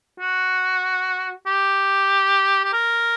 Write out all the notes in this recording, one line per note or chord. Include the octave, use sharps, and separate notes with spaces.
F#4
G4
G4
A#4